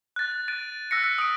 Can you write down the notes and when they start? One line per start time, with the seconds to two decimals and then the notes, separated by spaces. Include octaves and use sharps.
0.16 F#6 A6
0.32 F#6
0.48 F#6 A6 D7 D#7
0.91 E6 F#6 A#6 B6 C#7
1.04 E6 F#6
1.18 D#6 E6 D7